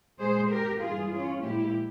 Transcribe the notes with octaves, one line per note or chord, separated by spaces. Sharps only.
A#2 G#3 G#4 C5
G4 A#4
G2 E3 G3 F4 G#4
C#4 F4
A#2 F3 G#3 E4 G4